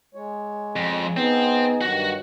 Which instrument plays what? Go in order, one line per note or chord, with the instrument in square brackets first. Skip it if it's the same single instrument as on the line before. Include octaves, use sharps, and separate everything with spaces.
[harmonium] G#3 C#5
[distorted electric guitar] F2
[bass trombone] B3 [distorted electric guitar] C4 [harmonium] D#4 G#4
[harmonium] G2 D#3 F#3 [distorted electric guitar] F#4 F#5